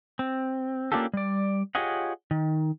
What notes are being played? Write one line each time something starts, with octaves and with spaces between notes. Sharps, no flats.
C4
A#3 C#4 D4 F4 G4 A4
G3 D5
F4 G4 G#4 C#5 D#5 F#5
D#3